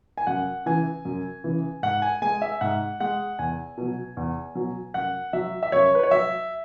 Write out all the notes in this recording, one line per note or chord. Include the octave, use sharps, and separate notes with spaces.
G#5
F#2 F#5
C#3 E3 G#5
F#2
C#3 E3
G#2 F#5
G#5
G#3 G#5
E5
G#2 F#5
G#3 F#5
E2 G#5
B2 F#3
E2
B2 F#3
F#2 F#5
F#3 E5
E5
F#2 C#5
B4
C#5
F#3 E5